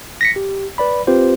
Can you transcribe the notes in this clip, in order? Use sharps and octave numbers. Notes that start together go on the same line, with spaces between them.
A#6 B6 C#7
G4
B4 D5 B5
C4 F4 G4 B4 C5